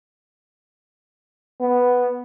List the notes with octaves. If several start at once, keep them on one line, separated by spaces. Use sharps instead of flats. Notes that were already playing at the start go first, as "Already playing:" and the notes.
B3